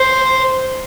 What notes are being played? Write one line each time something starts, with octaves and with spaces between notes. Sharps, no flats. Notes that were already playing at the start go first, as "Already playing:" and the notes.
Already playing: C5